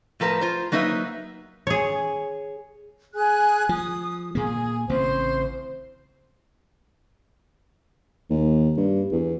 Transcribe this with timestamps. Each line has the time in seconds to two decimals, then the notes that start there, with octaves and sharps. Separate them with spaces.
0.20 A2 F3 A#4 B4 A5
0.41 F4 C5
0.72 F#3 A#3 D#4 B4 C5 E5
1.67 G#4 C#5
3.14 G#4 G#5 F#6
3.69 F3 D#6
4.35 A#2 A#3 G#4
4.89 A1 C#3 C4 C5
8.30 D#2
8.77 G2
9.12 E2